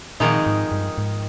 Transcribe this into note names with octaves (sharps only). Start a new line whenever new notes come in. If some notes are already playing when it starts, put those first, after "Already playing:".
F2 A#2 D#3 G#3 D#4
G#2
G2
G#2